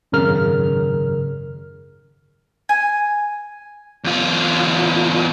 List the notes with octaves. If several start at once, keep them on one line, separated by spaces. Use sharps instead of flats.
G#1 F#2 C#3 A#4 F6
G#5
E2 F4